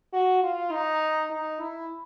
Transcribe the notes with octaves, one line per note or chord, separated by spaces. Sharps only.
F#4
F4
D#4
D#4
E4